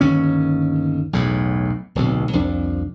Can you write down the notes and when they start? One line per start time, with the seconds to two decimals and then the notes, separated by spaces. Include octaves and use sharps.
0.01 G1 D#2 C#4
1.13 B1 E2 A2
1.95 D1 B1 C3
2.33 C2 F2 F3 D4